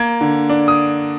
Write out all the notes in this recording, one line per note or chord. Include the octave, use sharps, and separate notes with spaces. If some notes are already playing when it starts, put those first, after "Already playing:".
Already playing: A#3 G#6
D3
D4
D#6